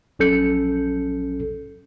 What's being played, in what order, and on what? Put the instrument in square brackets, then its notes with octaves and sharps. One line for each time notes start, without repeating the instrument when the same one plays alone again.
[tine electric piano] A#1 F#3 C#4 A4 G6 C#7